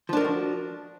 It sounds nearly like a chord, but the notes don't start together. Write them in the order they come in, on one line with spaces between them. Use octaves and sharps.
F3 D4 A#4 D#4 F#4